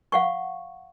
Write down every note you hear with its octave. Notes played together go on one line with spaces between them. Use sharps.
F5 F#5 C#6